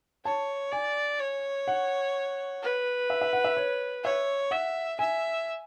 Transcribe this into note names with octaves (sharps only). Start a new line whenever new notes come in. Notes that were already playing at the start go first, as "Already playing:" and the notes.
C#5 A5
D5 G#5
C#5
F#5
B4
E5
E5
F#5
E5
C#5
C#5 E5
E5 F#5
E5 G#5